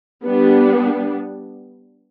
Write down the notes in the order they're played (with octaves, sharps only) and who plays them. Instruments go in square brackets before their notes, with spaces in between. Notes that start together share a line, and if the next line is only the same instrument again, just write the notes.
[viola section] G3 B3 D4